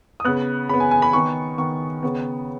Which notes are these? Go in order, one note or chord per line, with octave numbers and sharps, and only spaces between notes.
D#6
C#3 B3 F#6
C#3 B3 B5
G#5
G#5
B5
D#3 B3 C#6
D#3 B3 C#6
C#3 B3